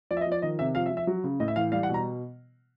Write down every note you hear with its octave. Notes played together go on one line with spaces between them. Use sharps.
F3 D5
E5
D#5
F3
D5
D#3 D#5
C3 E5
F3 F5
E5
F3
E5
F#3
C#3
A2 D#5
E5
E3 F5
G3 F5
F#5
B2 A#5